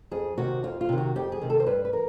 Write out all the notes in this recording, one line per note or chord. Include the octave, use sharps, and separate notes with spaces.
F2 G#4
C3 D#3 F#4
F2 F4
F4
C3 D#3
F#4
F2 G4
G#4
C3 D#3
A4
C5
G2 B4
B4
E3 A#4